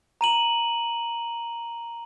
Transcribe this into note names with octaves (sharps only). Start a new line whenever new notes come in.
A#5 D#7 F#7